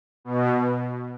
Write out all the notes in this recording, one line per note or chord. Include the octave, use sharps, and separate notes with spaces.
B2